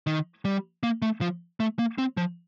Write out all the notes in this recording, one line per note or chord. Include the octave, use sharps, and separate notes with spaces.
D#3
G3
A#3
A3
F3
A3
A#3
C4
F3